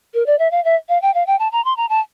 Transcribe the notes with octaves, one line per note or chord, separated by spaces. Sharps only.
A#4
D5
E5
F5
E5
F5
G5
F5
G5
A5
A#5
C6
A#5
A5